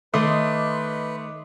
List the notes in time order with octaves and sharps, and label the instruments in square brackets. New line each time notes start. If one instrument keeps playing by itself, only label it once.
[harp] D#3 C#5 D#6 [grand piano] A3 [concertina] B4 [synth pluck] D#5 C6 D6